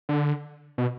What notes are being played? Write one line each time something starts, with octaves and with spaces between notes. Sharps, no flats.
D3
B2